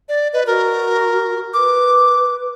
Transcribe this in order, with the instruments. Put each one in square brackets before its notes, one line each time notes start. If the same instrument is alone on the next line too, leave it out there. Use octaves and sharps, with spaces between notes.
[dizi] D5
[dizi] B4 [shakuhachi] D#5
[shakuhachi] F#4 [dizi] A#4
[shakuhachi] B4 [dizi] D6